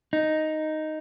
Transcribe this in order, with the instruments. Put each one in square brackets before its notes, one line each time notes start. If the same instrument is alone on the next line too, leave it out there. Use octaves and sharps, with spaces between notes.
[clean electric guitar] D#4